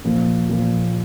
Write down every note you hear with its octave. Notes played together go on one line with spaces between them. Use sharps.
A#2 F3 A#3
A#2 F3 A#3